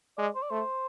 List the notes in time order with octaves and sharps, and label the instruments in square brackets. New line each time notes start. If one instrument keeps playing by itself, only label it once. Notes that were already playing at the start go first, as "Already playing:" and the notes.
[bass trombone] G#3 [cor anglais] D5
[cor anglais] C5
D5
[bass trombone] A3 [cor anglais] C5